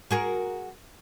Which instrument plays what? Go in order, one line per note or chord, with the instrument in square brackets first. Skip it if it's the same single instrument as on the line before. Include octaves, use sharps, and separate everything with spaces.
[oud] F#4 G#4 A#4